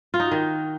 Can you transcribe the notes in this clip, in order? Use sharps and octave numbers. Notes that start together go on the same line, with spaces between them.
F4
D#4
F#4
D#3